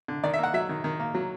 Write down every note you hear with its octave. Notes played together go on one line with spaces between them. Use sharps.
D3
D#3 D5
E5
A#3 F#5
F#3 E5
D#3
D#3
A#3
F#3